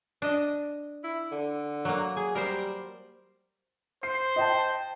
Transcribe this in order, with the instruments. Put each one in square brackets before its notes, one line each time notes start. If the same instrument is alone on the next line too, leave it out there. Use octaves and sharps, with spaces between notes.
[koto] D4 D#5
[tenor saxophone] E4
D3
[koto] F#3 A#3
[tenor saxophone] G#4 [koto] G#5
[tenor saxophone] G3 [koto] A#4 C5
[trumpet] C5 [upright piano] C7
[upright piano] D#5 G5 A5